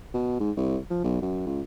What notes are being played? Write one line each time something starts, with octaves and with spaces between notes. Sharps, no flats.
B2
G#2
C2
F3
B1
F#2
C#2